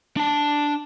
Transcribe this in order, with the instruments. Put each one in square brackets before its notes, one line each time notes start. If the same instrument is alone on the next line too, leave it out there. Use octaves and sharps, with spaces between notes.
[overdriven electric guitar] D4 A5